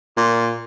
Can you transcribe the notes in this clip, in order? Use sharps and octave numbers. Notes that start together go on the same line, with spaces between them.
A#2